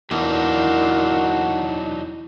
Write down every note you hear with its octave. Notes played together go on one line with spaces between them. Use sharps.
E2 A#2 F#3 D4 D#4 F#4